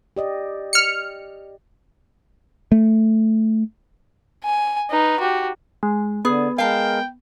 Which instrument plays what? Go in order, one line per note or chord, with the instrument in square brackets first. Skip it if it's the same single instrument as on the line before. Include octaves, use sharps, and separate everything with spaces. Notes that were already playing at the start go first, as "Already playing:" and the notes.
[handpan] G4 D5 D#5
[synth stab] F6 C#7
[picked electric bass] A3
[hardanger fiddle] G#5
D#4 B4
F#4 G4
[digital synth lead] G#3
[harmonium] D3 [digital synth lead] B3 [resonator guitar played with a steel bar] G#4
[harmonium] G#3 A#4 [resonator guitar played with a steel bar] F5 A5 [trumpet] G5